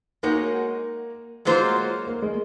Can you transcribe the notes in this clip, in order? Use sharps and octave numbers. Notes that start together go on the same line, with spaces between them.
G#3 A#3 D#4 F#4 C#5
F#3 G#3 A#3 F4 C5
A#3
G#3